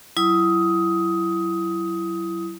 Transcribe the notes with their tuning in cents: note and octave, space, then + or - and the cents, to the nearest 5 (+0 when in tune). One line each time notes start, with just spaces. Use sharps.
F#3 +20 E4 +25 D#6 +15